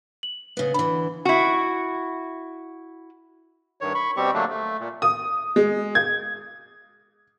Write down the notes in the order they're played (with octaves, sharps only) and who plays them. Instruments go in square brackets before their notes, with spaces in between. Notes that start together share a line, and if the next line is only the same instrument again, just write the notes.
[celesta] F#7
[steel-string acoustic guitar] C#3 B3
[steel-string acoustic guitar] D3 E3 [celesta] B5
[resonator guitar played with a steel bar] E4 F#4
[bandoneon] G2 D#3 C#5
B5 C#6
B2 G3 C4 G4 C#6
D3 F#3 A3 A#3 D4
A3
A#2
[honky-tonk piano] D#6
G#3
G#6